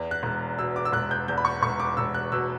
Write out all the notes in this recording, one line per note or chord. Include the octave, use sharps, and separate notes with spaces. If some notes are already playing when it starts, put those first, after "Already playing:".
Already playing: E2
F#6
E1
B2 E6
D6
E6
E1 F#6
G6
E2 G6
B5
C#6
E1 C#6
D6
E1 E6
F#6
B2 E6